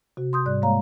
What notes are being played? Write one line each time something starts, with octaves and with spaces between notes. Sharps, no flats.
C3 F#4
C6 D#6 G6
G#2 G3 D5 F#6
G#3 A#3 C#5 F5 A#5